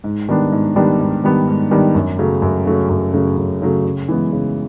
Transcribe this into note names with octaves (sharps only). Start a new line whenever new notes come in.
G#2
D#3 G3 B3 D4
G#2
D#3 G3 B3 D4
G#2
D#3 G3 B3 D4
G#2
D#3 G3 B3 D4
F#2
C#3 F#3 A3
F#2
C#3 F#3 A3
F#2
C#3 F#3 A3
F#2
C#3 F#3 A3
C#3
E3 G#3 B3
C#3